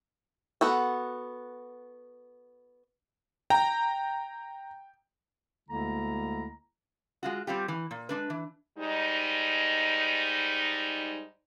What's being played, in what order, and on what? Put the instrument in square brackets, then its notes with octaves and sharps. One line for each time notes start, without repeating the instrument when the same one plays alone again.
[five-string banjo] B3 F#4 A4
[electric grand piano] G5 [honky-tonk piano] A#5
[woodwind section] D2 D3 G#3 A#3 E4 A#5
[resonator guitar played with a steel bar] G#3 F4 F#4
G3 C4 F4 G4
E3
A#2
G#3 D4 B4
E3
[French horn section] G#2 G3 D#4